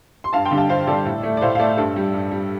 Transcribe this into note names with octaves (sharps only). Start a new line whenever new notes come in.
C6
G2 F5 A5
G5 C6
D3 G3
F5 A5
G2 C5 F5
D3 G3 A4 D5
A2
A3
D5
A2 C5 F5
F5
A3 A4 D5
G2 A4
G3
G2
G3